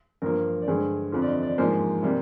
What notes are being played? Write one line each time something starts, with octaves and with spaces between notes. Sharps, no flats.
G2 F3 A#3 A#4
D5
G2 D3 G#3 C5
F2 D3 F3
D5
D#5
D5
G#2 F3 A#3 C5
C3 G3 A#3